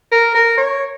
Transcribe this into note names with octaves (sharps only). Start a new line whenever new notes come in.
A#4
A#4
C#5